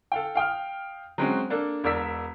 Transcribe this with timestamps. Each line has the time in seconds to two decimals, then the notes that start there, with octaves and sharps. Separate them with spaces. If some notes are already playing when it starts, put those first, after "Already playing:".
0.12 A4 F5 G5
0.35 F5 G5 D#6 F6
1.18 F#3 G#3 C4 C#4 F#4
1.50 A#3 D4 A4
1.84 E1 A#4 D5 E6 B6